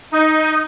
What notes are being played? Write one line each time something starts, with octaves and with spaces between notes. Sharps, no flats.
D#4